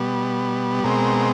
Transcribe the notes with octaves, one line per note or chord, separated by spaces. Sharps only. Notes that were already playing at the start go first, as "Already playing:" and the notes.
Already playing: B2 G3 B3
B2 G#3 C4 A#4